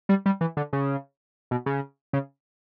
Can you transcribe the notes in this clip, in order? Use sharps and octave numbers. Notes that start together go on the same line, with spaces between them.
G3
G3
E3
D3
C#3
B2
C#3
C#3